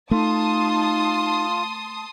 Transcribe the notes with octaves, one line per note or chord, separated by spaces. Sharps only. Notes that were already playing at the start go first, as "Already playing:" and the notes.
A3 D#4 F4 A5 C6 D#6